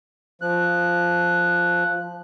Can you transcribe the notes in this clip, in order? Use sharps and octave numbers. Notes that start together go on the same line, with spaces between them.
F3 F#6